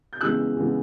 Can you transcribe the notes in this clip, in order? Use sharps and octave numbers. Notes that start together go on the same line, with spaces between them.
G6
C#3 E3 G#3 B3 E6 F#6
C#3 E3 G#3 B3